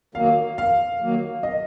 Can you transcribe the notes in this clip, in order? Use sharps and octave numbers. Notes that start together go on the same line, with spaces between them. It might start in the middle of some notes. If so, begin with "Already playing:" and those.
D#3 F#3 A#3 F5
F2 F5
D#3 F#3 A#3
D#5